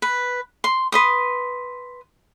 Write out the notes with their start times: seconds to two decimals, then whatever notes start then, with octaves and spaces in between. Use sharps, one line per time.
0.02 B4
0.64 C6
0.92 B4 C6 D#6